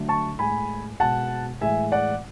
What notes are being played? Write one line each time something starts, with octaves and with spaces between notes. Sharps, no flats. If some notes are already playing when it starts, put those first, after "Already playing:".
Already playing: D3 F#3 A3
A5 C#6
A2 G#3 G#5 B5
B2 G#3 F#5 A5
A2 E3 G#3 E5 G#5
D5 F#5